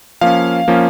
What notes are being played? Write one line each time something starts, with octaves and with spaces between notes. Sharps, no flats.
F3 A#3 C#4 F5
F3 A#3 C#4